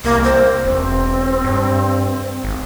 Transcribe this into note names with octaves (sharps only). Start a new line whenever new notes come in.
C2 A#3
C5
E1 C4
G2
G#1